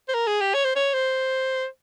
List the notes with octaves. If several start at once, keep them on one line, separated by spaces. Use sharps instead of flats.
C5
A#4
G#4
G4
C#5
C5
C#5
C5